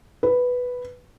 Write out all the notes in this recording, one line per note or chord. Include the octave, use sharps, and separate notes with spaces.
B4